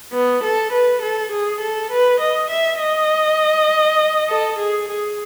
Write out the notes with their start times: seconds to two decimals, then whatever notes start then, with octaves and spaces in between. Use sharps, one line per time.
0.13 B3
0.43 A4
0.72 B4
1.02 A4
1.32 G#4
1.61 A4
1.91 B4
2.20 D#5
2.50 E5
2.80 D#5
4.29 A4
4.59 G#4
4.88 G#4